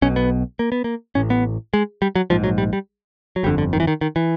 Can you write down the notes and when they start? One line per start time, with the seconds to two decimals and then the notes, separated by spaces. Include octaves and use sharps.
0.02 B1 B2 C#4
0.16 B3
0.59 A#3
0.72 B3
0.84 A#3
1.15 A1 A2 C#4
1.30 B3
1.74 G#3
2.02 G3
2.15 F#3
2.30 A#1 G#2 F3
2.44 F#3
2.58 G3
2.73 G3
3.36 F#3
3.43 G1 F2 D3 G3
3.58 D3
3.73 D#3
3.80 E3
3.87 D#3
4.01 D#3
4.16 E3